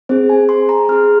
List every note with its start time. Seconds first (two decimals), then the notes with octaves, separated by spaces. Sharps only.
0.09 C4 G#4 C5
0.29 G#5
0.49 C6
0.69 A#5
0.89 C4 G#4 F6